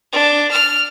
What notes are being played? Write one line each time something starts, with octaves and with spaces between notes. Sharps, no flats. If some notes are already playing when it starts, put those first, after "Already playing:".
D4
F6